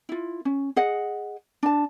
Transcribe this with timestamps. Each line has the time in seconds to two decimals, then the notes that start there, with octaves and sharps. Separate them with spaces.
0.09 E4 F4
0.45 C#4
0.76 G#4 D#5 F#5
1.63 D4 A5